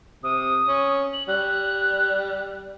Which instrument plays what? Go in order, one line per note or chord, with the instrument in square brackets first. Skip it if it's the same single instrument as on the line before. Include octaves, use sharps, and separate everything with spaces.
[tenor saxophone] C3 [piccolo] D#6
[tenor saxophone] C#4
[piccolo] F#7
[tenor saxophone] G3 [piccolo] F#6